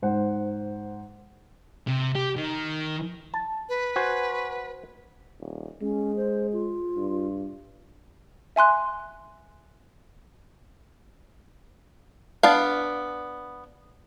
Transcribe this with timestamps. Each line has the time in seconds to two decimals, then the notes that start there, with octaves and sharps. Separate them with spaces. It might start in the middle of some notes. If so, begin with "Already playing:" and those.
0.02 G#2 C5 F#5
1.87 C3
2.15 G4
2.36 D#3
3.34 A5
3.69 B4
3.96 F#4 C5 G#5
5.40 D#1
5.82 G#3 C#4
6.16 C5
6.53 F4
6.97 G2
8.56 E5 G#5 C6 F#6
12.43 B3 D4 F5